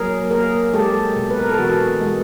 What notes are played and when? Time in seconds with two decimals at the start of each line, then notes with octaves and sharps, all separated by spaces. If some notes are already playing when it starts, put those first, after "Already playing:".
Already playing: F#3 A#3 G#4 A#4
0.31 A#3 G#4 A#4
0.73 G#3 G4 A4
1.16 B2
1.30 B4
1.39 A#4
1.49 A4
1.58 E3 F#4 G#4
2.01 G#3